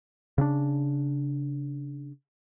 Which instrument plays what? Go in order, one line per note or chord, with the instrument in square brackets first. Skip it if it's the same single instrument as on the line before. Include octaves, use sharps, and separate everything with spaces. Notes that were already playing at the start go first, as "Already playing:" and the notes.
[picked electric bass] C#3 C4 D4